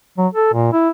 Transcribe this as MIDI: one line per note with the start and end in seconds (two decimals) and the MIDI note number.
0.18 0.28 54
0.34 0.50 69
0.54 0.70 46
0.73 0.89 64